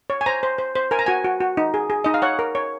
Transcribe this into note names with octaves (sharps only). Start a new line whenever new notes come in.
C#5
G#5
C5 A#5
C5
C5
C5
A#4 G#5
A#5
F#4 G#5
F#4
F#4
D#4
G#4
G#4
D#4 D#5
F5
C#5 F#5
A#4
C#5